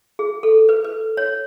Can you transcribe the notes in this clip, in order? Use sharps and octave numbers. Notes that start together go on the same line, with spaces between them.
G#4
A4
B4
B4
C#5